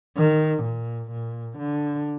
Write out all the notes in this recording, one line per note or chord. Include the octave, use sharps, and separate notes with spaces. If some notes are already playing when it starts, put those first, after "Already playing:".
D#3
A#2
A#2
D3